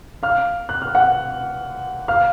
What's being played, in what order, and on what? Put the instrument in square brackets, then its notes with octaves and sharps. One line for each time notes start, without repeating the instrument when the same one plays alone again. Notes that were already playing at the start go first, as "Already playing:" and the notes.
[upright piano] F5 F6
F#6
F6
F#5 F#6
F5 F6